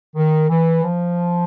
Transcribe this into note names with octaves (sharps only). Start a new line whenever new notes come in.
D#3
E3
F3